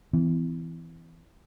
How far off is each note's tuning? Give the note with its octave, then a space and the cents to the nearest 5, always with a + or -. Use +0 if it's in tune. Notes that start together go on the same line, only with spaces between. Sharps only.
E3 +0 B3 +45